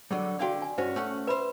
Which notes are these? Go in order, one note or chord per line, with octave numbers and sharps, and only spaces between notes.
D3 F#3 G3
D3 F#4 D5 F5 G5
G#5
G2 C#4 F#4 C5
A3 C#4 F#5
B4 C5 E5 B5